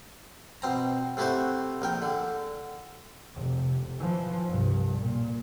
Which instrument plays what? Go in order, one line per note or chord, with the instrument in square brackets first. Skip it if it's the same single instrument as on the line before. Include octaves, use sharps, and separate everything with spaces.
[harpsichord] B2 C4 A#5
C3 A3 E4 F#4 C5
A#1 A#4 G5
D3
[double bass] F1 C3
E3 F3
C2 G2
A#2